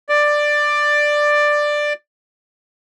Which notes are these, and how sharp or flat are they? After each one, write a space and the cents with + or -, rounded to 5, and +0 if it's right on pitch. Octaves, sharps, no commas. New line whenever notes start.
D5 +10